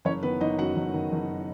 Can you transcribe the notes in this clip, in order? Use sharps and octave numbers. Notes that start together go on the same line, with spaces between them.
F#1 C#4 C#5
D#3 B3 B4
F#1 D#4 D#5
F#2 F#4 F#5
F#1
D#3
F#1